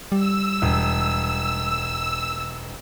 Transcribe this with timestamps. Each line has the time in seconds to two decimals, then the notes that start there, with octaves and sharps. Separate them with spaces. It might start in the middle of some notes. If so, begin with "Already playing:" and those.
0.12 G3 E6
0.62 E1